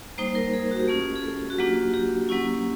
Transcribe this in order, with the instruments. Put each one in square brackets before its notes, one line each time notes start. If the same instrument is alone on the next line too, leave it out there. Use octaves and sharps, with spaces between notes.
[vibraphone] G3 A#3 D#4 C5
A#4
G#4
F#4
G4
A3 C#4 F4 G#4
G#4
A4
F#4
F#3 A#3 D4 F4 G4
G4
F#3 A#3 C#4 E4